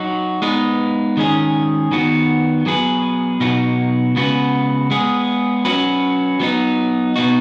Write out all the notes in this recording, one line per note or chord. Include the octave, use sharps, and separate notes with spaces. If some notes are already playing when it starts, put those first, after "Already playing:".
Already playing: F#3 D#4 F#4
G#3 B3 D#4 B4
D#3 G#3 C#4 G#4
D#3 B3 F#4 B4
F#3 B3 G#4 B4
B2 F#3 D#4 F#4 B4
C#3 G#3 B3 F#4 B4
G#3 B3 G#4
F#3 C#4 F#4 B4
F#3 B3 D#4
B2 B3 D#4 F#4